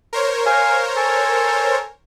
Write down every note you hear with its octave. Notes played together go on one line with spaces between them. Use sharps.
A#4 C5 C#5
F5 G#5
A4 G#5